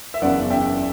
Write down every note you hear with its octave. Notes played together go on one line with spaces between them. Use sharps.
E5
F#1 E2 C#3 D5 F#5
E5 G5